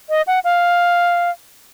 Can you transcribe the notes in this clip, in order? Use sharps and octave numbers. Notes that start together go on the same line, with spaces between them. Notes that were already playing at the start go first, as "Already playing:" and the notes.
D#5
F#5
F5